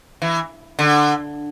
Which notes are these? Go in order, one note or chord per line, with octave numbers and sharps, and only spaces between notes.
E3
D3